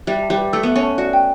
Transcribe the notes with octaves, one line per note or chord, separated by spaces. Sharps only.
G3 E5
A5
G3
B4
A3 E6
B3 E5
C#4
A5
F#4 D5
G5